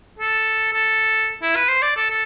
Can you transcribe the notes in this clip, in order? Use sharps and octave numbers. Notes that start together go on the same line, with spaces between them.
A4
A4
E4
B4
C5
D5
A4
A4